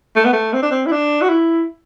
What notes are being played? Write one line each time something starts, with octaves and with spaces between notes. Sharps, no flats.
A3
B3
A3
C4
D4
C4
E4
D4
F#4
E4